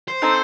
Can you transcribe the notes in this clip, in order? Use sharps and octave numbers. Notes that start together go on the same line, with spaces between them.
C5
C4 D#4 A4